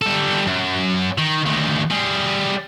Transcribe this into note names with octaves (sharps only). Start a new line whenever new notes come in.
G3 A4
F#2
D#3
D2 D#3
G3 G#4